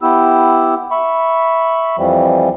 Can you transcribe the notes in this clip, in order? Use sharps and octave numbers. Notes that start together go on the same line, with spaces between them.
B3 E4 G4 E6
E5 B5 C#6
F2 E3 F3 G3